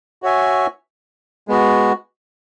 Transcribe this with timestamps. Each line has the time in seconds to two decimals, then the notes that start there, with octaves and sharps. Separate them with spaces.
0.22 F#4 C#5 E5 G#5
1.48 G#3 B3 F#4